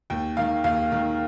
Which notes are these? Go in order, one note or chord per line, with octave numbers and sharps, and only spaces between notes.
D#2 G5
D#3 F5
D#2 F5
D#3